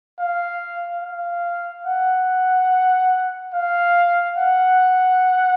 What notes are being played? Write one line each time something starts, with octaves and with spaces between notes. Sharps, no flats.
F5
F5
F#5
F5
F#5